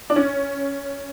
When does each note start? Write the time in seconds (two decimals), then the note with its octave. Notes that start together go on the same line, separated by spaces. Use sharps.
0.10 D4
0.16 C#4